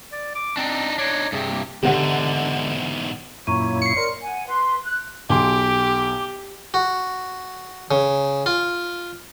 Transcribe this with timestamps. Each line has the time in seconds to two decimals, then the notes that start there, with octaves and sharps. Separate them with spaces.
0.12 D5
0.35 D6
0.57 C4 D4 D#4
0.98 D4 D#4 C#5
1.32 G2 C3 G#4
1.50 A#3
1.83 E2 G#2 D3 G4 F#5
3.47 F#2 A#2 A#3 E4 C#5 A#5 C#6 D#7
3.82 C#6 C7 C#7
3.96 A#4 C#5 D5 C6
4.21 F#5 G#5
4.47 B4 C6
4.84 F#6
5.30 B1 G4 G#5 C6 D6
6.74 F#4
7.91 C#3
8.46 F4